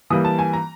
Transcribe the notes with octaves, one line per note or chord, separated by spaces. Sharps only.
E3 G3 A#3 D#6
A5
G#5
A#5